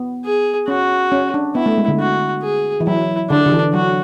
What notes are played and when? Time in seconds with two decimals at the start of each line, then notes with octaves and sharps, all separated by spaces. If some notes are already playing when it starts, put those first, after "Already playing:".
Already playing: B3
0.25 G#4
0.68 C#4 F#4
1.12 C#4
1.34 D4
1.55 B3 E4
1.66 A3
1.78 G#3
1.88 D3
2.00 F#4
2.42 G#4
2.80 E3
2.87 F#3 E4
3.30 D3 D4
3.46 D3
3.52 E3
3.73 F#3 F#4